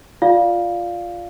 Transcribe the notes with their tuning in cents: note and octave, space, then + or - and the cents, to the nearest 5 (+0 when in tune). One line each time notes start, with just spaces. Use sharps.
F4 +0 D5 +0 F5 +0